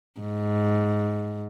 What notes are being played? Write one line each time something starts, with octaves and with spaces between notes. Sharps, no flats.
G#2